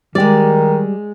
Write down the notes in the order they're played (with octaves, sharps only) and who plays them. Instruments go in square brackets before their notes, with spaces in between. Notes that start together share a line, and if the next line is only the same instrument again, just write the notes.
[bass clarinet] D#3 [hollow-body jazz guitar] G3 G4 [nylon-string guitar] G#3 D5